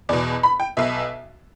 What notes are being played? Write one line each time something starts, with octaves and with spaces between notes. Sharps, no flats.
E2 B2 D5
B5
G5
B1 B2 E5